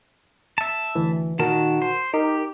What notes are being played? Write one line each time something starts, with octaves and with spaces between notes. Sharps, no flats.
E5 A5
D2 E3
A#2 D#3 F#4 A#4 A5 A#5
C5
D#4 G4 A#4